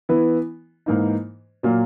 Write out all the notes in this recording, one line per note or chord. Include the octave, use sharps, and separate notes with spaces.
E3 B3 E4
G#2 E3 A#3 D#4
A#2 F#3 A#3